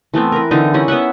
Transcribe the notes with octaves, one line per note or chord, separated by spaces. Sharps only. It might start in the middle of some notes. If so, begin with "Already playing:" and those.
E3 A3 B3 C4
A#4 B4
D3 E3 C4 D#4
G3 C#4 E4 D#5
B3 B4 E5 F#5